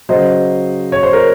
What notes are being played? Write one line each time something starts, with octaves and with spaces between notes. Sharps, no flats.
C#3 F#3 C5 D#5
C#5
C5
A#4